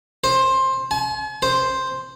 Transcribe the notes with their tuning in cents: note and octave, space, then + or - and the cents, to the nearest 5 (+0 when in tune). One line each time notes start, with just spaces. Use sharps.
C5 +15
G#5 +45
C5 +0